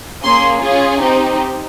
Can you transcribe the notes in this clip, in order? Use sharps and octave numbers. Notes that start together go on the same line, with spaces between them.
A#3 C#4 G#4 C6
C#4 F4 G#4
C4 D#4 G4